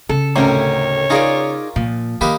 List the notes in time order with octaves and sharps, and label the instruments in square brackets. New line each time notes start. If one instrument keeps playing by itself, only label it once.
[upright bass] C#3 [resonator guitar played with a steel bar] A4
[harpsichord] D2 A2 D#3 [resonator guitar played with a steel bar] C3 C#4 A#4 [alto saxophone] C#5
[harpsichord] C#4 F4 A#4 [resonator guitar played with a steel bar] D#4 G#4 D5
[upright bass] A#2 [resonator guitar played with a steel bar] F3
[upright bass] D#3 [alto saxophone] A#3 [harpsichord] G4 B4 D#5